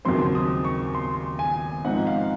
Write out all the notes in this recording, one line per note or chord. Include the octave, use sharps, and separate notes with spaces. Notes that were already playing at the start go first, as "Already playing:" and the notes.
D#2 C#3 F#3 C4 C6
D#6
C#6
C6
G#5
G#2 F3 C4 D#4 F#5
F5